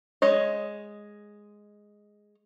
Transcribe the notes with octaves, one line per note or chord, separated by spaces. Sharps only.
G#3 C#5 D#5